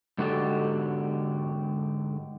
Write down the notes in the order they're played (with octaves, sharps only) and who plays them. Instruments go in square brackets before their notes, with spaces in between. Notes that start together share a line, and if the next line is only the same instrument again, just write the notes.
[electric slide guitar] G#2 D3 F#4 G4 A4 D5